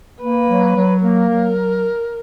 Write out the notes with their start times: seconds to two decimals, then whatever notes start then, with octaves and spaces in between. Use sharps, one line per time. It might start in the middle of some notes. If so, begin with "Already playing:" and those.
0.21 A#3 B4
0.48 F#3
0.75 F#3
1.01 A#3 A#4
1.28 F#3